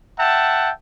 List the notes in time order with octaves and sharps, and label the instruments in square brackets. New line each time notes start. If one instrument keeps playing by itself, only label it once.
[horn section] E5 F#5 G5 A5